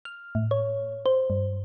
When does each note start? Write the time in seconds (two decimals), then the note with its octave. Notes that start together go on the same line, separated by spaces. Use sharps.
0.05 F6
0.35 A2
0.51 C#5
1.06 C5
1.30 G2